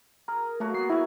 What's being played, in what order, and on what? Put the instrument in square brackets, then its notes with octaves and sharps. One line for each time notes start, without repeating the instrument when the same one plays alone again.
[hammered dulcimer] G#4 [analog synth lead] A#4
[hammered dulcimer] F#3 A#3 F#4 [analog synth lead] A3
[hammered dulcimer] B3 G#4 [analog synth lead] C7
[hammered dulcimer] F#3 A#4 G#5 [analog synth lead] E4